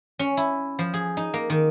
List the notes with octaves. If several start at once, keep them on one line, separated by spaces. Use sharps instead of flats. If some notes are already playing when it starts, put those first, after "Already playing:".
C#4
E4
F3
G#4
D#4
A#3
D#3